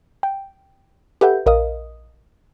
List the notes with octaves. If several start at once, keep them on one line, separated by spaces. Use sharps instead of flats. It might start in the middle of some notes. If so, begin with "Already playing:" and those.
G5
G4 A4 B4 E5 F#5 G6
A#1 A#4 D#5 F5 D#6